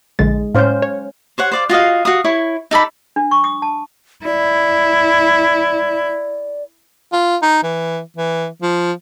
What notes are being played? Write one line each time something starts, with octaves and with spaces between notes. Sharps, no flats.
A#1 D3 G#3 A6
A2 C#4 C5 F5 G6
C#5
C5 C#5 F#5
C5 D5 F5
F4 F#4 D#5 F5
F#4 F5 D#6
E4 C#5 C#6
D#4 A4 D5 B5
D4
C#6
D#6
A5
E4 D5
F4
D#4
E3
E3
F3